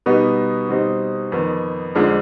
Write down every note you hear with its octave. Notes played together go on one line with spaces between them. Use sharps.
B2 G3 B3 D#4
B2 G3 C4 D#4
F2 D#3 B3
F2 D3 F3 G#3 D4